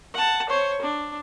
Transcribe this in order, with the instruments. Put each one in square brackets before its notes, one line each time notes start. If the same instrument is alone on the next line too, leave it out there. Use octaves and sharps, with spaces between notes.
[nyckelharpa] F#5 A5
C5 C#5
D4